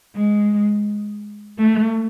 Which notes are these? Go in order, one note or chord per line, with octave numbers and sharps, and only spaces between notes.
G#3
A3